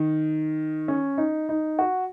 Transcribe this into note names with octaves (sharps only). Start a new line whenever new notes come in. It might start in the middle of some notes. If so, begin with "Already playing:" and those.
Already playing: D#3
C#4
D#4
D#4
F#4